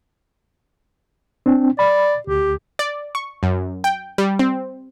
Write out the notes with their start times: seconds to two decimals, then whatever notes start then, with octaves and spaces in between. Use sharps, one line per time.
1.46 C4 D4
1.79 D5 B5
2.27 D2 G4
2.79 D5
3.15 C#6
3.43 F#2
3.84 G5
4.18 G3
4.39 C4